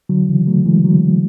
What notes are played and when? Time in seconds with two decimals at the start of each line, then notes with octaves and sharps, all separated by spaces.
0.09 D3 F#3
0.29 C#3 E3
0.47 F#3 A3
0.66 E3 G#3
0.84 D3 F#3